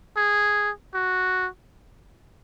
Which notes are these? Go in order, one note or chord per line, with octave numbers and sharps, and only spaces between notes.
G#4
F#4